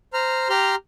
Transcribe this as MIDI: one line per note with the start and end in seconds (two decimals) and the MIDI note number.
0.13 0.49 72
0.13 0.49 82
0.13 0.49 89
0.50 0.75 67
0.50 0.75 82
0.50 0.75 84
0.50 0.75 89